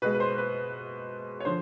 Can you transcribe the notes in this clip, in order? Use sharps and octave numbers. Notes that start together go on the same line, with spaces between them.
B2 G#3 B4
B4
C5
B4
C#5
D3 F3 C5